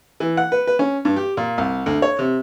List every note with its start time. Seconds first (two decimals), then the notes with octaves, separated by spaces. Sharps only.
0.20 E3
0.37 F#5
0.52 B4
0.67 B4
0.79 C#4
1.05 G2
1.16 G4
1.37 A#2
1.58 C2
1.86 D2
2.02 C#5
2.19 C3